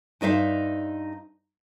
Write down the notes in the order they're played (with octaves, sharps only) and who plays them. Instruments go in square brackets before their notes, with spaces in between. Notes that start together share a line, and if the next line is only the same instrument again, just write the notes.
[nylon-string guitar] G2 D#4 C5 E5 F5